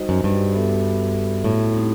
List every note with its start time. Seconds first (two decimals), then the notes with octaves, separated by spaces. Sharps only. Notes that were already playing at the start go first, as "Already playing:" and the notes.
Already playing: G3 D#4 F#4 C5 D#5
0.09 F#2
0.24 G2
0.54 B3 F#4 A4 E5
1.44 A2
1.74 C4 D#4 G4